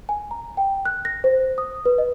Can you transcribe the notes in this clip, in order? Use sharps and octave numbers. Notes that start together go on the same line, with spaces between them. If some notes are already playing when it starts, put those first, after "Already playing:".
G#5
A#5
G5
F#6
A#6
C5
D#6
B4
D#5